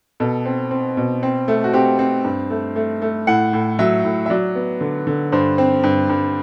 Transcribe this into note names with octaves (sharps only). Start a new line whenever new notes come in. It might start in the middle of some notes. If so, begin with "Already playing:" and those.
B2 A4
C4
C4
B2
C4
A3
F#4
C4 G4
C4
G2
A3
A3
A3
A2 F#5
A2
F#3 E5
A2
E5
F#3 D5
B3
D3
D3
G2 C5
C4
G2
G2